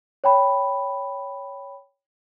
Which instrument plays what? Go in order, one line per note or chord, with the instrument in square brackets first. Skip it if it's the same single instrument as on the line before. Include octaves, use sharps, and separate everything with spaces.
[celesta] C#5 G5 B5